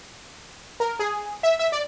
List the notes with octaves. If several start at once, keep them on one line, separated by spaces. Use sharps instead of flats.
A#4
G#4
E5
E5
D5